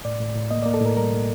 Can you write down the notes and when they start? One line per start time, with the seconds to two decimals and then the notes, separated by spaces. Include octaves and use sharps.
0.05 A2 D5
0.20 A2
0.36 A2
0.51 A#3 D#5
0.63 D5
0.66 A#3
0.74 A4
0.81 A2 A#4
0.97 G3 A#4
1.12 A2